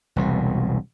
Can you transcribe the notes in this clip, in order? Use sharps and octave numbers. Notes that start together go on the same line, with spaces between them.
E1 C2 B2